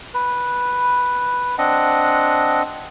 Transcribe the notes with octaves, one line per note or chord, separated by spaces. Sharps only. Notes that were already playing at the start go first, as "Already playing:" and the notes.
B4
C4 D4 D#5 F#5